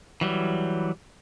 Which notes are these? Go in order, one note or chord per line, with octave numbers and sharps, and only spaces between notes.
E3 F#3 G3